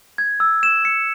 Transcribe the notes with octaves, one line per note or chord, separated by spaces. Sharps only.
G#6
E6
E7
C#7